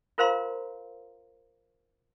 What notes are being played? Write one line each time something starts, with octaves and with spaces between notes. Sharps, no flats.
F4 A#4 C5 F5 A#5 C6